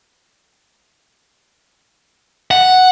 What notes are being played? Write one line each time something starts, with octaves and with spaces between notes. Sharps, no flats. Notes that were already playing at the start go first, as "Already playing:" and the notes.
F#5